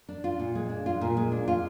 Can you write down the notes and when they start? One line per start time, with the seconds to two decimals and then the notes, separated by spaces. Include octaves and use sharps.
0.09 D4
0.24 F4
0.39 A#2
0.55 G#3
0.70 D4
0.86 F4
1.01 A#2
1.17 G#3
1.32 D4
1.48 F4